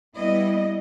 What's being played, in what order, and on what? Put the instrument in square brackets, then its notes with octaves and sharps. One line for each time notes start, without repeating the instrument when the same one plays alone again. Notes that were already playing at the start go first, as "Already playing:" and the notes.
[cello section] G3 B3 E4 D#5